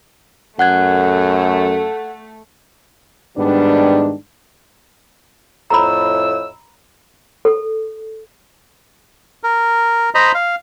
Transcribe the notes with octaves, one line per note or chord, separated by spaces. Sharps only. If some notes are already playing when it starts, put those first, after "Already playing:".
F#2 A3 F#5 F#6 G#6
G#2 D#3 G3 B3 D4
F2 A2 A#5 B5 E6
A4
A#4
C5 D#5 A#5 B5
F5